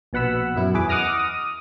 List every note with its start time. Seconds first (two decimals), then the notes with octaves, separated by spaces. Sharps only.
0.13 A#1 B2 F#5 B5 E6
0.56 F#2 E4
0.74 E2 G#4 B4 D6
0.89 D#5 F#5 D6 D#6 F6 A#6
1.19 D#6